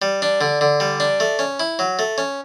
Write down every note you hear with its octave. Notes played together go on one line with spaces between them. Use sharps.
G3
D4
D3
D3
G3
D4
A3
C#4
E4
F#3
A3
C#4